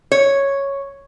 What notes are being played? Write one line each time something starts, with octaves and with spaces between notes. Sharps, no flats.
C#5